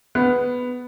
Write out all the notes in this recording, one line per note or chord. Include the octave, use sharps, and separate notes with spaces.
B3